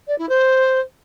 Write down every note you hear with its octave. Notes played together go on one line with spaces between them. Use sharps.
D5
E4
C5